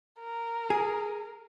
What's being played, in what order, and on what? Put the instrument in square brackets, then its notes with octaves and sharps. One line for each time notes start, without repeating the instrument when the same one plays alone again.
[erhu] A#4
[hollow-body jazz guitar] G#4